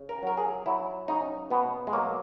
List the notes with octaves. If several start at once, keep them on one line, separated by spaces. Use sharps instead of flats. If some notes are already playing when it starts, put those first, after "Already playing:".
Already playing: C#3
A#4
F#3 A#4
G#4
F#3 E4
C#3 D#4
B2 B3
G#3
F#3 A#3